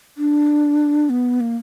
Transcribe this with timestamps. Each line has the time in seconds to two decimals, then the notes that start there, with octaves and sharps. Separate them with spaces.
0.18 D4
1.10 B3
1.40 A#3